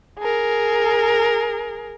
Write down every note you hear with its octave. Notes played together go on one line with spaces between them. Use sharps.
G#4 A#4